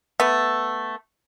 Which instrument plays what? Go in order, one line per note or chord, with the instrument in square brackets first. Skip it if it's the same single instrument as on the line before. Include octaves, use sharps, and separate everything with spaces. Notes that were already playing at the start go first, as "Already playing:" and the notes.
[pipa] A3 B3